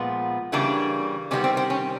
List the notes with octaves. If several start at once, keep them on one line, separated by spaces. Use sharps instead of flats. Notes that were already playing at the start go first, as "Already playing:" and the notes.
Already playing: A#2 F3 G#3 B3
C#3 E3 G3 A#3 D4
C3 D#3 G3 B3 C#4
C4
C4
C#4